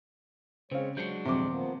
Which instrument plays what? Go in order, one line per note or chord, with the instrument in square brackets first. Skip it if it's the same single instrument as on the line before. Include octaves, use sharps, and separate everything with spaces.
[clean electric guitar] C#3 [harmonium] G#3 C#5 [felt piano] C4 F5
[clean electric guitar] F#3 G#3 D4 [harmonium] F#4 [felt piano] G6 C#7
[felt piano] D#1 F2 D6 [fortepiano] C3
[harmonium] F3 A#3 B3